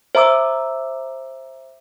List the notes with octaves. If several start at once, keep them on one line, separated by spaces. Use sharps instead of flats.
C5 E5 A#5 D6 E6